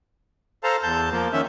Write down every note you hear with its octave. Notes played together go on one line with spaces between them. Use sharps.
A4 C5 F5 A5 A#5
E2 A5 G6
F3 A#3
D#3 C#4 E5